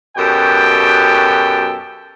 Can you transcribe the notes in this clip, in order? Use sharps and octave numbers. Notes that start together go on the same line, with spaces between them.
F#2 B2 G4 A4 G5